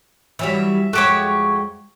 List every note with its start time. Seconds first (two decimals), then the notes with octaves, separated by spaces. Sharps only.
0.39 E3 F#3 G3 E5
0.93 F2 G#3 F#4 G4 A4 C#5